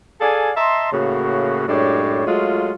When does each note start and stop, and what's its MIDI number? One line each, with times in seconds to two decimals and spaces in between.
0.21 0.52 68
0.21 0.52 69
0.21 0.52 74
0.21 0.52 77
0.21 0.52 80
0.57 0.92 75
0.57 0.92 76
0.57 0.92 81
0.57 0.92 82
0.57 0.92 84
0.93 1.64 45
0.93 1.64 49
0.93 1.64 58
0.93 1.64 66
1.68 2.23 42
1.68 2.23 45
1.68 2.23 56
1.68 2.23 62
1.68 2.23 67
1.68 2.23 73
2.26 2.72 54
2.26 2.72 56
2.26 2.72 57
2.26 2.72 65